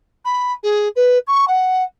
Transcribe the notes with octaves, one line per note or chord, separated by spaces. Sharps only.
B5
G#4
B4
C#6
F#5